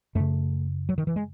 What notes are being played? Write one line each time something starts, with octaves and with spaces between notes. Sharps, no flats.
F#2 C#3 A3
F#3
D#3
E3
G#3